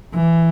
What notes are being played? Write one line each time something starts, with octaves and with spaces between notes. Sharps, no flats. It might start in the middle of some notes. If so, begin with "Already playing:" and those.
E3